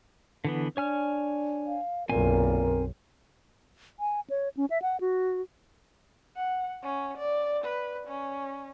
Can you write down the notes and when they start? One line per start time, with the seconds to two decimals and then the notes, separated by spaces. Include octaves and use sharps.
0.45 D3 E3 B3
0.77 D4 C#5 G#5 F6
1.67 F5
2.09 B1 F#2 A#2 C4 A#4 G#5
4.00 G#5
4.30 C#5
4.57 C#4
4.70 E5
4.82 F#5
5.01 F#4
6.36 F#5
6.83 C#4
7.18 D5
7.64 B4
8.08 C#4